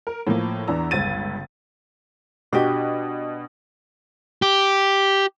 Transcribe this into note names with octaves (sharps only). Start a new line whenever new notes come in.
A#4
A2 F3 A#3
E2 E3 D4 A#5 E6
G1 C#2 G#6 A6 D#7
B2 D4 F#4 G4
G4